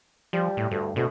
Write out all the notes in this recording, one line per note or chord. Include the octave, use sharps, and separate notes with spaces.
F3 G3
A2
D2 G2
D2 B2